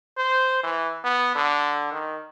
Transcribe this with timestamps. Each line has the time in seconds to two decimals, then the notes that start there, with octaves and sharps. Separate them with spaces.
0.17 C5
0.63 E3
1.04 B3
1.35 D3
1.92 D#3